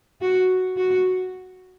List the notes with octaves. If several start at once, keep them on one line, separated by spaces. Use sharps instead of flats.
F#4
F#4